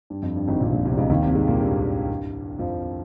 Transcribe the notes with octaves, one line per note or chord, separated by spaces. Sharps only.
G2
F2
G2
G#1 G#2
A#1 A#2
A#1 A#2
C2 C3
C#2 C#3
D#2 D#3
C2 C3
G#2 G#3
A#2 A#3
G2 G3
F2 F3